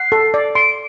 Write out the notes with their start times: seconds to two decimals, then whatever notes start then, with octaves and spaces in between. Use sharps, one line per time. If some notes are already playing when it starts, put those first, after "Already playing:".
Already playing: F#5 C7
0.12 A4
0.34 D5
0.55 C6 D7